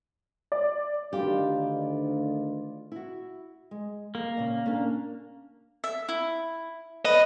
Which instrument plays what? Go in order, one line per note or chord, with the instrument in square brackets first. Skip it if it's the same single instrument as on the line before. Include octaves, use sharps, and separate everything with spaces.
[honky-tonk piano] D5
[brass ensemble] D2 D#3 [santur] F4 D5 B5 [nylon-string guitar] G4
[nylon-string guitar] E4 F#4
G#3
[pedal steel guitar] A#3 [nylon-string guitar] A#4
[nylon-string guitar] A#2 C#3
C#4 D4 A#4
[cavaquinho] E5
E4
[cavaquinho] B4 [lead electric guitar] D#5